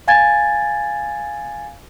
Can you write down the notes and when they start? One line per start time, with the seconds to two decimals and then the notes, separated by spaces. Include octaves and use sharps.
0.08 F5 G#5 G#6 A6